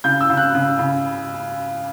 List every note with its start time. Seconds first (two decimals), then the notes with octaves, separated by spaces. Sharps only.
0.04 C#3 G6
0.21 E6
0.30 C#3
0.37 F#6
0.55 C#3
0.79 C#3